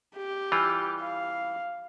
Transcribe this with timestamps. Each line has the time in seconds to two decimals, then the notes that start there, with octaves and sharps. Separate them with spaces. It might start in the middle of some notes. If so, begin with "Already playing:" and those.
0.17 G4
0.52 E3 G3 F4
1.00 F5